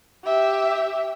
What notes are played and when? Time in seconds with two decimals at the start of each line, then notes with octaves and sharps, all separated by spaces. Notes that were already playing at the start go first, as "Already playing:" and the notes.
0.25 G4 E5